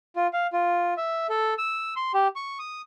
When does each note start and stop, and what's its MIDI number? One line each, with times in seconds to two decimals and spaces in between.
0.16 0.27 65
0.33 0.47 77
0.53 0.94 65
0.97 1.27 76
1.29 1.54 69
1.58 1.94 88
1.96 2.12 84
2.14 2.28 67
2.36 2.58 85
2.59 2.82 87